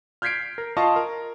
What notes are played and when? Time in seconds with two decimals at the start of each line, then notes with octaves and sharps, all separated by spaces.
0.22 F6 G6 G#6 B6 C7 D7
0.58 A#4
0.77 F4 D#5 F5 A5 C#6
0.96 A#4